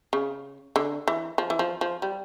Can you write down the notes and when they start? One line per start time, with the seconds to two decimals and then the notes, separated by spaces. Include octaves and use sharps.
0.13 C#3
0.76 D3
1.08 E3
1.38 F3
1.50 E3
1.59 F3
1.81 F3
2.02 G3